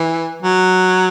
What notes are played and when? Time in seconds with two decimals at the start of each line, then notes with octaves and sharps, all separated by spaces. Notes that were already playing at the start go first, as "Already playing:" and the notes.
Already playing: E3
0.42 F#3